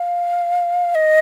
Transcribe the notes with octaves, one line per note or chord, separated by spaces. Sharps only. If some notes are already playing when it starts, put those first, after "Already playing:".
Already playing: F5
D#5